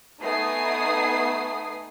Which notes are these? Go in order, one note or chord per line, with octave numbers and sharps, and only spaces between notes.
A3 B3 D#4 G#5 D#6 C7